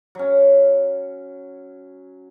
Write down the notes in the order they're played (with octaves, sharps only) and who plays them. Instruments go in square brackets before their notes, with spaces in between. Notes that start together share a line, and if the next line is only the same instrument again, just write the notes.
[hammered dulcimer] F#3 C#4